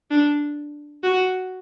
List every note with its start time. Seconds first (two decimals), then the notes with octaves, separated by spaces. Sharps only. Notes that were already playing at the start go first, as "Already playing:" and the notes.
0.11 D4
1.03 F#4